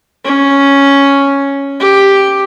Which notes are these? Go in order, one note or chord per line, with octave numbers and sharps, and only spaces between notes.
C#4
G4